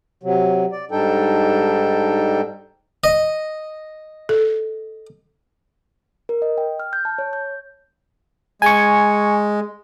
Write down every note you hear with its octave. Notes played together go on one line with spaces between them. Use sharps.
C3 F#3
D5
G#2 G3 D4 D#4 A4 G5
D#5
A4
A#4
D#5
G5
F6
G6
A5
C#5
G6
G#3 G#5 C#6